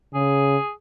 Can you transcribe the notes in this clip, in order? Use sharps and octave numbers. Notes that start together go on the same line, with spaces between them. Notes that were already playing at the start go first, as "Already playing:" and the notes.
C#3 G#4